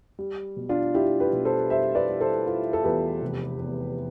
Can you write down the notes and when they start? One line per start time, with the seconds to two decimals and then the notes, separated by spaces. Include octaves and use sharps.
0.19 G3
0.57 B2
0.69 D4 F4
0.94 G3 E4 G4
1.20 G4 B4
1.33 B2
1.45 A4 C5
1.70 G3 C5 E5
1.95 B4 D5
2.09 G3
2.21 A4 C5
2.46 G3 F4 A4
2.73 A4
2.84 E2 G4 B4
3.22 F1
3.59 E2